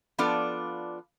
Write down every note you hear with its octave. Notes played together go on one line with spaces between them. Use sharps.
F3 B3 D4 F4 A4 D5